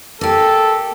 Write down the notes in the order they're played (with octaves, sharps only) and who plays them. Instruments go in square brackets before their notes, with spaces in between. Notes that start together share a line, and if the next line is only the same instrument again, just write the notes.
[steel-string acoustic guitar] A#3 G4 [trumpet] A4